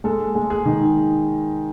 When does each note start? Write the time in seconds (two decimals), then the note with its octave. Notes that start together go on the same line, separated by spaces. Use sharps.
0.04 G#3 A4
0.35 G#3
0.50 G#4
0.66 D#3